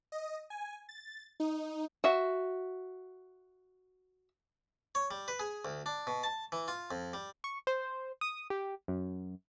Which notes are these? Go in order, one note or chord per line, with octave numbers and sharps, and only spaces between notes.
D#5
G#5
A6
D#4
F#4 E5
C#5
G3
B4
G#4
D2
D4
B2
A5
E3
F4
F2
G3
C#6
C5
D#6
G4
F#2